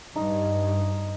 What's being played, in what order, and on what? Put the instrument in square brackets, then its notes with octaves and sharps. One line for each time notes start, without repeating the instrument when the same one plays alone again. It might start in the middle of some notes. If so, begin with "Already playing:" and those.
[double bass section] G2 [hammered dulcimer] D#4